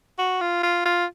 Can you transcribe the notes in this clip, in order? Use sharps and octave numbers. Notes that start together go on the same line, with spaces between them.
F#4
F4
F4
F4